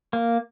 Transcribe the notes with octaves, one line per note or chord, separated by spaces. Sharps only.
A#3